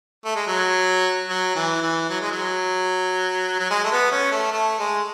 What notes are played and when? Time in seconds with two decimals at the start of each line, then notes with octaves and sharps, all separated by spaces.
0.25 A3
0.36 G#3
0.47 F#3
1.28 F#3
1.55 E3
1.82 E3
2.09 F#3
2.21 G#3
2.31 F#3
3.60 F#3
3.70 G#3
3.84 A3
3.92 B3
4.11 C#4
4.31 A3
4.52 A3
4.79 G#3